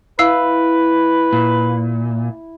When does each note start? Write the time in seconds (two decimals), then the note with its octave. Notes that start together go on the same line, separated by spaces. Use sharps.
0.19 E4 B4 F5 E6 C7
1.33 A#2